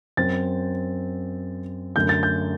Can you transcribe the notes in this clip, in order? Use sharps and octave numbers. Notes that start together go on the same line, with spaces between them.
F#2 F#3 C4 A6
F#2 D3 F#3 A3 G6
A6
G6